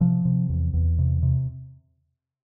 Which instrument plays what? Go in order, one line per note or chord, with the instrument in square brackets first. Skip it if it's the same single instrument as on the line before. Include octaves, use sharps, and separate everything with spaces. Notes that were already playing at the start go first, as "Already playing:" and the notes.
[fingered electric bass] C3 F3
C3
E2
E2
C3
C3